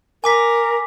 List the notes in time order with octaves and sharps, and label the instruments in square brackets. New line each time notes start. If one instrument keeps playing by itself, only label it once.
[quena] A#4 [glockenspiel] G#5 D6 B6